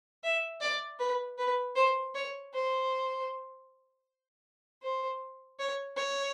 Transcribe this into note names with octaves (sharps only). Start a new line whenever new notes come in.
E5
D5
B4
B4
C5
C#5
C5
C5
C#5
C#5